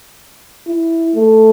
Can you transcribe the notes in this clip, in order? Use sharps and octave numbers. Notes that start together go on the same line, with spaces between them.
E4
A3